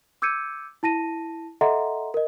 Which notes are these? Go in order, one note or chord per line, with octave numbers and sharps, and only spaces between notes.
D6 E6 G6 G#6 C#7 D#7
E4 A5 A#6 D#7
A4 D#5 E5 F#5 A#5 C6
A#4 D#5